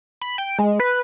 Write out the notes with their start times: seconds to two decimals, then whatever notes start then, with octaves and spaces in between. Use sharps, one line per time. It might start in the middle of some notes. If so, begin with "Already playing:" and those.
0.21 B5
0.38 G5
0.59 G#3
0.80 B4